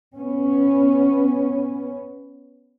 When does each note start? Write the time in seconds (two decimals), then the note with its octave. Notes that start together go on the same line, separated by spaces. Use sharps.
0.16 B3 C#4